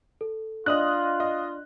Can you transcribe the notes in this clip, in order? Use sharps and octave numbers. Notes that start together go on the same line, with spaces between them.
A4
D4 F4 D5 D#5 D#6 F#6 F#7
D#5